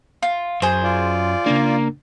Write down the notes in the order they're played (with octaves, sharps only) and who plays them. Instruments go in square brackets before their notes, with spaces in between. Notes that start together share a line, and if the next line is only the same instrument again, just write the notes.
[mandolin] F4
[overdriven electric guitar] F#2 [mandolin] G#4 C5
[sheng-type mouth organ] F4 D5
[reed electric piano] C#3 D4 [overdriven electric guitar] A#3